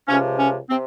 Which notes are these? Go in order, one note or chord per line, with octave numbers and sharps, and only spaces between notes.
C#2 C3 F3 C#4
C#4
C3 C4